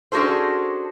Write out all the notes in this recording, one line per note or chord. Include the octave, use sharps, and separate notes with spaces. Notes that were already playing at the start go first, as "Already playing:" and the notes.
C#4 D4 F#4 G#4 A4 C5